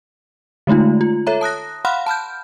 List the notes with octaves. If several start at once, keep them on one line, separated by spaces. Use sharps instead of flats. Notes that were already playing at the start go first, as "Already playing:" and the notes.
D3 G#3 A3 D#4 F4
F4
A4 C#5 E5 A#5
A5 D#6 F#6 A#6
F5 F#5 B5 C6 F6 F#6
A5 B5 F6 G6